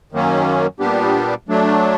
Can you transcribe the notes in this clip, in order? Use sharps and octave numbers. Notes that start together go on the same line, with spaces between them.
F#2 D#3 F#3 A#3 C#4
A#2 G3 B3 D4 G4
F#3 A3 D4